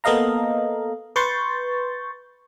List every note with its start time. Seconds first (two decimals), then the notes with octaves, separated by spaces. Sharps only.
0.04 A#3 B3 A4 D#5 F5 A#5
1.16 B4 C6 C#6 G6 A6